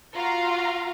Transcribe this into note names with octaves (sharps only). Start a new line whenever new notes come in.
F4 F#4 F5 A#5